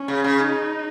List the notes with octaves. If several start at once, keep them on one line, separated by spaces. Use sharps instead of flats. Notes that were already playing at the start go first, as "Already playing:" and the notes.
Already playing: C#4
C#3
C#3
D#4